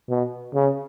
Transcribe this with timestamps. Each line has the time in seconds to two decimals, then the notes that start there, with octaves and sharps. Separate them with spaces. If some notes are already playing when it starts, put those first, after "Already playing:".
0.09 B2
0.54 C#3